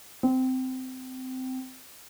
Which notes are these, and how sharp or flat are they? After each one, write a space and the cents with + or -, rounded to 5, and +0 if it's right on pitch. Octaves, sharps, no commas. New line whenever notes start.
C4 -20